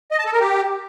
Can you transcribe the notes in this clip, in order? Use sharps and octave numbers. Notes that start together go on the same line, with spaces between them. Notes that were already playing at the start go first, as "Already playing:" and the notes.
D#5
A5
A4
A#4
G4